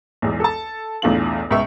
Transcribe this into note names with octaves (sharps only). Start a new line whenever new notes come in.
B1 E2 G#3
A4 A5
B1 E2 A2 D4 F4 F#7
C#2 B2 E5 C#6